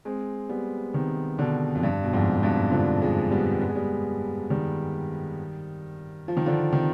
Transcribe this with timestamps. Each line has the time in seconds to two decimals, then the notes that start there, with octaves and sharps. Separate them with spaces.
0.05 G#3 C4
0.49 G3 B3
0.94 C3 D#3
1.38 B2 D3
1.75 F2
1.83 G2
2.03 B2
2.13 F2 G#2
2.42 G2 B2
2.72 D3 F3
3.02 F3 G#3
3.31 G3 B3
3.61 B3
3.69 G#3
3.75 G3 B3
4.50 D#3 G3
6.28 F3
6.37 D#3
6.46 D3 F3
6.73 C3 D#3